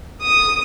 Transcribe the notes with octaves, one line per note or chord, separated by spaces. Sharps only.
D#6